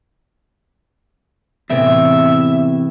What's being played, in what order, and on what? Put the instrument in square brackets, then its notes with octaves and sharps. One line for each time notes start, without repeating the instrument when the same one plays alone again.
[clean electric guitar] E2 [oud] A2 C3 C4 [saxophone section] E5